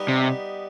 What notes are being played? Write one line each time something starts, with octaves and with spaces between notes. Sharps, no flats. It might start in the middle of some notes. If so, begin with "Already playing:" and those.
Already playing: G3 B3 D#4
C3